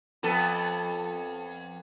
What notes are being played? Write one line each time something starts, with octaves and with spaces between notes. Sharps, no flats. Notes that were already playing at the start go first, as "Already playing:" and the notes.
F2 B3 A4